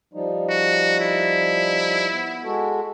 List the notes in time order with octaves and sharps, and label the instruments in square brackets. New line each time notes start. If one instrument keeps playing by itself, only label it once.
[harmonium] F3 G3 D#4
[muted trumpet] F#4
E4
[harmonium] B3
G#3 F#4 A4